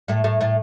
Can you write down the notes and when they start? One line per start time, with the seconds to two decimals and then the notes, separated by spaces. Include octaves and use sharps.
0.08 A2 A3
0.24 A2 A3
0.40 A2 A3